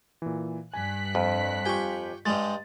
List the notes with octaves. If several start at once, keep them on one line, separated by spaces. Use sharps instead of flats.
A#2 E3
G2 G#5 F#6 B6
F2
F4 G4 G5 G#5 C#6
G2 G3 G#3 A6